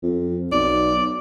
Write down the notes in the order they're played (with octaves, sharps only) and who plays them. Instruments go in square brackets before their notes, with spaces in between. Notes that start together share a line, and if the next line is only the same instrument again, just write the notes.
[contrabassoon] F2
[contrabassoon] B1 [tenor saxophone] D5